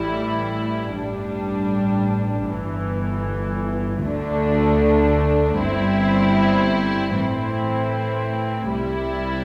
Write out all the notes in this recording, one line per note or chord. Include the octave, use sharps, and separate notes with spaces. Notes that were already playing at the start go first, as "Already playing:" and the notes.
Already playing: A1 A2 E3 G3 E4
A1 G2 G3 D4
G1 G2 E3
D2 D3 A3 D4
G1 G2 G3 C4 E4
A2 E3 C4 E4
C2 C3 G3 E4